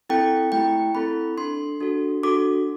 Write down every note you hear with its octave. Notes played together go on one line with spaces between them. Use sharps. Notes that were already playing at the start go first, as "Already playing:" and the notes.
C4 E4 A4 G5
A3 E4 G4 G5
C4 E4 A4 B5
D4 A4 C6
D4 F#4 A4
D4 F#4 A4 D6